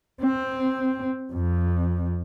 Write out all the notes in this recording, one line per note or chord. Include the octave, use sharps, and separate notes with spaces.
C4
F2